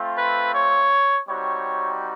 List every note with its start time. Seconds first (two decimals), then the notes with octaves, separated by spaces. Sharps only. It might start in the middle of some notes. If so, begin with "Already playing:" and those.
Already playing: A3 C4 F4
0.17 B4
0.53 C#5
1.27 G3 C4 D#4 F#4 C#5